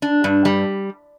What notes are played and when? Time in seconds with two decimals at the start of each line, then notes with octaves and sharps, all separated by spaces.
0.02 D4
0.24 G2
0.45 G3